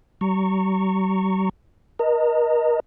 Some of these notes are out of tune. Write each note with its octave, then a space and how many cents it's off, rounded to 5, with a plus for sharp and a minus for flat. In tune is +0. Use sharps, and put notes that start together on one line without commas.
G3 -45 A#5 -25 C#6 +0
A#4 +35 D#5 +0 A#5 -40